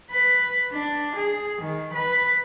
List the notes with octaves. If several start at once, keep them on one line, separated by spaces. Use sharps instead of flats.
B4
D4
G#4
D#3
B4